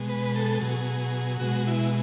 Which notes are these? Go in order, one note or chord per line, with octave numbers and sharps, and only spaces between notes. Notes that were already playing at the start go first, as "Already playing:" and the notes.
Already playing: B2 G#3
B4
A4
B2 F#3 G#4
B2 G#3 F#4
E4